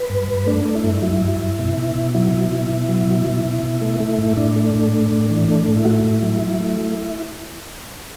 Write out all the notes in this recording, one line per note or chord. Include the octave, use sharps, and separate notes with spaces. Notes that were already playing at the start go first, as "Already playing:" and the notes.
Already playing: B4
G2
G2
A3 D4
A3
E4
G2
F#3 E4
G2
G2
B2
B2
B2
F#3 E4
B2
B2
B2
F#3
B2
B2
B2
B2
A3
A3
A2
A2 D4
A3
A2
A3
A2
E3
A3 D4
A2
E4
A3 F#4
E4
A2
F#3
F#3
A3